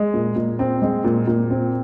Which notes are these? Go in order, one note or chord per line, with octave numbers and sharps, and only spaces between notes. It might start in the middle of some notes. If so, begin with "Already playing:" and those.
Already playing: G#3
A#2
A#2
C4
G#3
A#2
A#2
C4